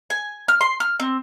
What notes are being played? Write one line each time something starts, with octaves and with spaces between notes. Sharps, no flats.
G#5
F6
C6
F6
C4